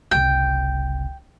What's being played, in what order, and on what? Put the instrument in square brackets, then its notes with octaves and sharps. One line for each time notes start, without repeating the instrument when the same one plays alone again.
[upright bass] F#1 C2 [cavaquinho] G5